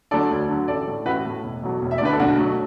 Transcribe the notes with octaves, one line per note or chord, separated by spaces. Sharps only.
D3 F#3 A3 A4 D5
D2
D3 F#3
A1 A4 D5
A2 A3
A1 F#4 B4
A2 A3
E1
E2 B2 F#3 A3
E1
E5
D5
D2 D3 A3 B4
A4
B1 D4 F#4
B2 F#3 A3